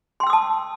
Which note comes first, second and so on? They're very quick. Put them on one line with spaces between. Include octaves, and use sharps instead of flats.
C6 G5 E6 D#6 A5